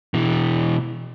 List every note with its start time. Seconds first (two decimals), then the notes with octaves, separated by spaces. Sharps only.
0.14 B2 E3